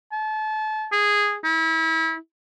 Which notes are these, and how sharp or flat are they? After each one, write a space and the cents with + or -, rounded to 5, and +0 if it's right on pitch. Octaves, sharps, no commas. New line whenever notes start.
A5 -30
G#4 -10
E4 -30